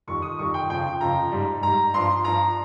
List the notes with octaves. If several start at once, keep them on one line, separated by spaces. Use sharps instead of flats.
F2 D#3 G3 C#6
D#6
F2 D#3 G3 C#6
G5
F2 C#3 F3 G5
F2 C#3 F3 A#5
G#2 G3
G#2 G3 A#5
G2 F3 C6
G2 F3 A#5